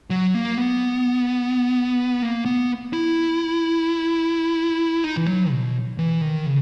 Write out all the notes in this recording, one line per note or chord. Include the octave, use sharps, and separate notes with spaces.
F#3
A#3
B3
A#3
B3
E4
D#4
E3
F#3
B2
E3
D#3
C#3